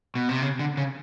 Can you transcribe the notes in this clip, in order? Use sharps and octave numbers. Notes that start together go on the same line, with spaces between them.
B2
C3
C#3
D3
C#3